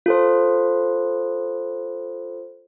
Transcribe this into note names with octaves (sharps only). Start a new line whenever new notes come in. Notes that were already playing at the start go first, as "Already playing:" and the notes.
F4 A4 C5